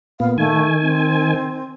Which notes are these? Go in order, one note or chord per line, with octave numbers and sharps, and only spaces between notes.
A#2 B3 F5
D#3 A3 G#5
C4